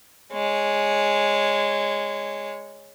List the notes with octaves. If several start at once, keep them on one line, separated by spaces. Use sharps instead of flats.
G#3 C#5